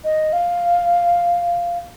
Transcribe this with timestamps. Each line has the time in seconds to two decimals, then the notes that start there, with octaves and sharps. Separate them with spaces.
0.04 D#5
0.33 F5